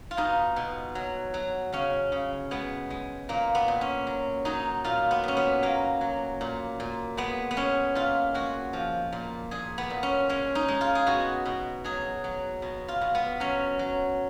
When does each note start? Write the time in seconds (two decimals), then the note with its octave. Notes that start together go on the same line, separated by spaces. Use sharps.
0.11 F4
0.17 B2 D#4
0.56 B2
0.95 F#3
1.34 F#3
1.72 C#3 C#4
2.12 C#3
2.51 G#3 B3
2.90 G#3
3.29 A#2 A#3
3.55 B3
3.68 A#2
3.81 C#4
4.07 F#3
4.45 F#3 D#4
4.84 A#2 F4
5.11 B3
5.24 A#2 C#4
5.37 B3
5.62 F#3 A#3
6.01 F#3
6.41 A#2
6.80 A#2
7.17 G#3 B3
7.51 B3
7.57 G#3 C#4
7.95 A#2 F4
8.34 G#3 F#4
8.73 F3
9.12 A#2
9.51 A#2 G#4
9.78 B3
9.90 A#2
10.03 C#4
10.29 G#3 C#4
10.55 D#4
10.68 G#3
10.81 F4
10.95 G#4
11.06 B2 F#4
11.45 B2
11.84 F#3 G#4
12.24 F#3
12.62 B2
12.88 F4
13.01 B2
13.15 B3
13.40 F#3 C#4
13.79 F#3